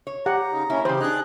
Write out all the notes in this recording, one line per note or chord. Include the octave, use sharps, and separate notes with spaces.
C#5
G4 F#5 A#5
C#3 D#4
A#3 C#4 E4
C#3 E3 G4 C5
D4 D#4 G#4 F#6